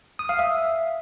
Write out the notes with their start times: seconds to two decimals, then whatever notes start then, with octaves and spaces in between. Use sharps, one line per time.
0.19 D#6
0.29 F5
0.39 E5